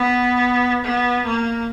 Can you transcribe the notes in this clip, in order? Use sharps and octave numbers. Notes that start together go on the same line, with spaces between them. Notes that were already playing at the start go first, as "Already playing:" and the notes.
Already playing: B3
B3
A#3